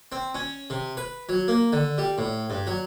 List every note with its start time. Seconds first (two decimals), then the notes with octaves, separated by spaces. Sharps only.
0.12 C4
0.35 C#4
0.70 C3
0.97 B4
1.29 F#3
1.48 A#3
1.72 D3
1.98 G3
2.18 A2
2.50 G2
2.67 F#3